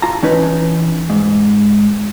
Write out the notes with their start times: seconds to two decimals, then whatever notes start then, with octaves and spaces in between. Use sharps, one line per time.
0.02 F4 A5 A#5
0.22 E3 C#4 D#4 B4
1.10 G#2